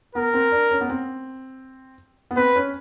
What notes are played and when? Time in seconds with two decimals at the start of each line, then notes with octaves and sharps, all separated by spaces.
0.15 B3 A#4
0.34 C4
0.52 D4
0.71 C#4
0.81 B3
0.89 C4
2.31 B3
2.36 C4 B4
2.56 C#4